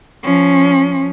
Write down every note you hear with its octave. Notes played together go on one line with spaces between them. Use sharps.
F3 C#4